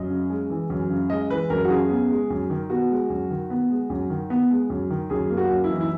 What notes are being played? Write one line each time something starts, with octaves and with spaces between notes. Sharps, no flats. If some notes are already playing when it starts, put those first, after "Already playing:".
Already playing: F#2 D#5
C#3
G#3
E3
F#2
C#3
G#3 D#5
E3 B4
F#2 A#4
F#4
C#3 G#4
B3
G#3
F#2
D#3
B3 F#4
G#3
F#2
D#3
B3
G#3
F#2
D#3
B3
G#3
F#2
D#3
F#2 G#4
A#3
F#4
F#2
E4
E3 D#4
E4